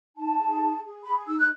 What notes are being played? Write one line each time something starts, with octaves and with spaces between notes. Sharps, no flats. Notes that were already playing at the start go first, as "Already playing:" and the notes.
D#4 A5
G#4
G#4
G#4
G#4 B5
D#4 E6
F#6